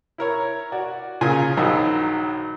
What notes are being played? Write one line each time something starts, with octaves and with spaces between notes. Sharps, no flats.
E4 A#4 C#5
F#4 D5
A#2 C#3 F4 G#5
A#1 D#3 F#3 D#4 E6